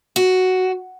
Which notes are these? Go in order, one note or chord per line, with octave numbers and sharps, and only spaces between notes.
F#4